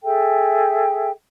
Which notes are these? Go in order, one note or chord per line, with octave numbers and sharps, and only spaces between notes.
G#4 A4 E5 G5